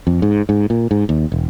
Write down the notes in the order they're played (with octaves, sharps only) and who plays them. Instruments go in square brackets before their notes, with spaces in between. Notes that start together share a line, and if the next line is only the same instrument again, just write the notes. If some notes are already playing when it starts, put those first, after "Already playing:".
[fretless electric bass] F2
G#2
G#2
A#2
G#2
D#2
E1